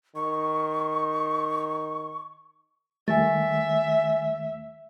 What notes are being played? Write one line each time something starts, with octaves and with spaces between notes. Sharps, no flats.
D#3 C#6
D#2 D#3 G3 A3 E5 G#5 A6